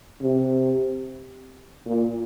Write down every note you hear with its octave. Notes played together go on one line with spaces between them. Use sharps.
C3
A#2